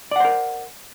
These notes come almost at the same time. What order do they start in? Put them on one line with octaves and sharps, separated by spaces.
D5 F#5 C5 A#4